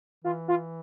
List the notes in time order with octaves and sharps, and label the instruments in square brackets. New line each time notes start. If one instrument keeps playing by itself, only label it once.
[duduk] E3 [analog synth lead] F4
[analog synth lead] F4